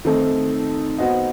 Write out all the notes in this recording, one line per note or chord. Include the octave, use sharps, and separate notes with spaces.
D#3 A3 C4 D#4 A4
B3 F#4 C5 D#5